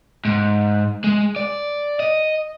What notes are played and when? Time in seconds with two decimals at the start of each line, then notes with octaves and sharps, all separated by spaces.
0.25 G#2
1.04 G#3
1.36 D5
2.00 D#5